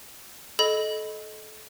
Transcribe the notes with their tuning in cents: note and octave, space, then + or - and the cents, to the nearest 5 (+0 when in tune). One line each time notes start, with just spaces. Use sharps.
A4 -25 D#5 +0 B5 +0